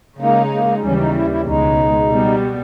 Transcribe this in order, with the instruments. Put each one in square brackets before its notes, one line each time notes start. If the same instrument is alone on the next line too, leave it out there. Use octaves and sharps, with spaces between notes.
[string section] C#3 G#3 D#4 [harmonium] A#3
[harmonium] A#3
[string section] D#2 C#3 E3 G3 [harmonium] C#4
[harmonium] D#4
E4
E4
[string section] C#2 B2 G#3 [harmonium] D#4
[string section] B2 G3 B3